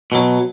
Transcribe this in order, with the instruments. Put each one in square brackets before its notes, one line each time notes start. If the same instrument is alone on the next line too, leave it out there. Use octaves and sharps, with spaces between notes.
[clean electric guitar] B2 F#3